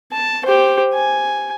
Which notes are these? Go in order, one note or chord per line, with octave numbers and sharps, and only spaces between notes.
A5
G4 C5
G#5